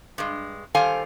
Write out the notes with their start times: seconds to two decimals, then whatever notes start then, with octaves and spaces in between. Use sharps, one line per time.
0.18 G2 G#3
0.74 D#3 G3 A4 C5 F5 G#5